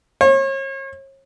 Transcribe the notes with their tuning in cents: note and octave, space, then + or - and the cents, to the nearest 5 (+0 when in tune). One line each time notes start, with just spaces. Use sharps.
C#5 -40